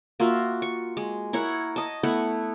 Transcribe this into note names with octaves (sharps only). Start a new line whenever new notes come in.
A#3 F4 F#4 E5
C#6
G#3
E4 A#4 C#5 F#5
D#5 A5
A3 B3 E4 F#5